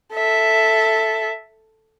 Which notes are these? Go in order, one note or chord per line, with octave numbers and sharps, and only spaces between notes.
A4 E5